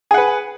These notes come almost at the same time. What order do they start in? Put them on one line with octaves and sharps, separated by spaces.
G#4 F#5 B4